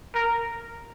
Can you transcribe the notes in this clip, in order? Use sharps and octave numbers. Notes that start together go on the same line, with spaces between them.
A#4